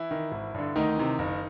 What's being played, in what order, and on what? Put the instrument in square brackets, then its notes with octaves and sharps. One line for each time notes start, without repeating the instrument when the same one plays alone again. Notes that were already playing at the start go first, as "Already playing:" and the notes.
Already playing: [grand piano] E3 E4
D#3
G#1
G2 D3
D2 D#3 D#4
C3 E3
F#1